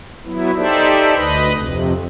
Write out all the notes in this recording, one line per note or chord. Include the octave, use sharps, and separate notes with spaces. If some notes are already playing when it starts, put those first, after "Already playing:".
F#3 B3 E4
D#4 G4 A4 C5 D5 E5
D2 B4 D#5 B5
F2 C3